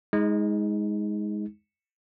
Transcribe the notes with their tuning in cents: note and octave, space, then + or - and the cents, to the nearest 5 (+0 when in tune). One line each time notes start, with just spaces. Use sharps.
G#3 +0 D#4 +30